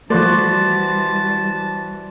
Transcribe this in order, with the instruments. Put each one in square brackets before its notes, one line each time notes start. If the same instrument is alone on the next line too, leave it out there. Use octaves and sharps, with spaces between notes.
[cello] E3 G3 [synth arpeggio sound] F3 A3 [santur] F#4 C5 D5 [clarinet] A5